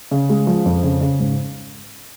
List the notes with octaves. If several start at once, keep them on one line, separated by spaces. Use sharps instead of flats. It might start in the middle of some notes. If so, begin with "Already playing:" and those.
C#3
G#3
F3
F2
C#3
C#3
G#2